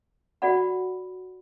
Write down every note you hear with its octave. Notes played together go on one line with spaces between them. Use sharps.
F#4 A4 D5 F#5 B5